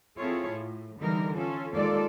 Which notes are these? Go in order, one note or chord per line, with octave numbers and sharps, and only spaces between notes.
C4 E4 F4 G#4 A4 C#5
A2
D3 E3 G3 D#4 A#4
C#4 F4 A4
D#2 D#3 G#3 F4 A4 D5